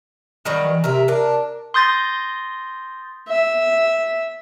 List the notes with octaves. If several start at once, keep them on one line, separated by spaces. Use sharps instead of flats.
D#3 F#3 G3
E3
C3 A#4 E5
D4 A#4
C6 D#6 G6 A6 A#6
E5